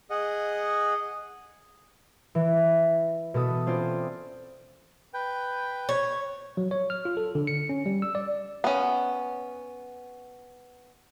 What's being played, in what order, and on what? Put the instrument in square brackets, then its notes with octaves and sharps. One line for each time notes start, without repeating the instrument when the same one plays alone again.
[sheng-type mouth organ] G#4 D#5 F#5
[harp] E3
B2 B3 A4 D#6
C4 C#4 F4 C5 D5
[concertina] B4 G5
[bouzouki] C#5
[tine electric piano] F#3
C#5
F6
F4
A4
D3
C#7
C#4
G3
E6
D5
[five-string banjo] B3 C#4